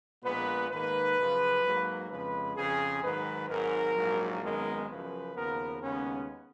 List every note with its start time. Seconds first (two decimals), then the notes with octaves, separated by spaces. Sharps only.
0.23 A#1 A#2 G#3 B3 B4
0.70 G#2 D#3 A#3 B4
1.17 F#2 C#3 F3
1.63 G#2 F#3 A#3
2.09 F2 C#3 F3 G#3 B4
2.56 F2 C#3 F3 G#4
3.03 G#2 D#3 F#3 B4
3.49 G#1 G#2 F#3 A#4
3.96 A#1 G#2 F#3 A#3
4.42 G#1 F#2 D#3 G#3 B3 A#4
4.88 F#2 C#3 F3 B4
5.35 D#2 C#3 F3 B3 A#4
5.82 D#2 C#3 G#3 B3 C#4